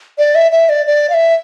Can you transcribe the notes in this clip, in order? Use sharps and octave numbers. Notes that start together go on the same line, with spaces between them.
D5
E5
E5
D5
D5
F5
E5